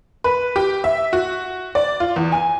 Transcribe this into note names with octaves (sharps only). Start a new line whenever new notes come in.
B4
G4
E5
F#4
D5
F4
E2
G#5